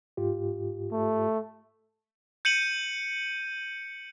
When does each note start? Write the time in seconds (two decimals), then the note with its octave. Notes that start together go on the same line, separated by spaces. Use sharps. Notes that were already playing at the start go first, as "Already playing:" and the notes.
0.17 G#2 F4 G4
0.92 A3
2.45 G6 C#7 D#7 F#7